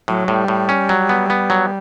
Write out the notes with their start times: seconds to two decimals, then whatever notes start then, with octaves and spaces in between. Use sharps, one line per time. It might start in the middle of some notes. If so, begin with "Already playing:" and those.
0.08 A2 F#3
0.28 A2 G3
0.48 A2
0.69 C#4
0.89 F#3
1.09 B3
1.30 B3
1.50 F#3